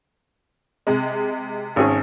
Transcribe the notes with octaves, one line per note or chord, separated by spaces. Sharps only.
C3 G#3
G#1 C#4 G#4